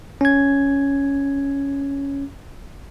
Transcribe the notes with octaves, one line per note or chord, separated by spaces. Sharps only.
C#4 G#6